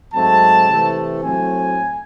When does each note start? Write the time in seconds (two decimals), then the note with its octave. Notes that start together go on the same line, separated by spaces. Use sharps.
0.13 G#2 F#3 A3 C4 A5
0.68 C3 E3 A3
1.22 A2 F#3 A3 C4 G#5